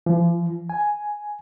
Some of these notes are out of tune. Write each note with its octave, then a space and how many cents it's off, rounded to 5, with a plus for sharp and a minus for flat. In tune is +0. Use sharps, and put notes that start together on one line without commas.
F3 -40
G#5 +5